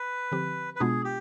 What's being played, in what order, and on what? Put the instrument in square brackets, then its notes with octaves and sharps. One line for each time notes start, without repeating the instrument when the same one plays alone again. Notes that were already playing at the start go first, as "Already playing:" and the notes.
Already playing: [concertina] B4
[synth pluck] D3 F3 C4 G4
[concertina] B4
[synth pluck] B2 G#3 B3 D4 F4 [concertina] G#4
[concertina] G4